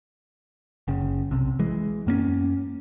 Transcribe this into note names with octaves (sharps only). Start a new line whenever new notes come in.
F#1 C#3
B1 C3
E3 G#3
F#2 A#3 B3 C#4